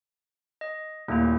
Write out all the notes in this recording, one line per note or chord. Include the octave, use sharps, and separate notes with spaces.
D#5
D#1 A#2 A3 A#3 E4